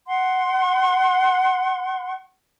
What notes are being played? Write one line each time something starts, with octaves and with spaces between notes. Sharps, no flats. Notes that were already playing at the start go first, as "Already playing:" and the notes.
F#5 C6